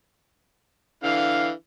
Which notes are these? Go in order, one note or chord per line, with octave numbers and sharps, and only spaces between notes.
D3 E3 F5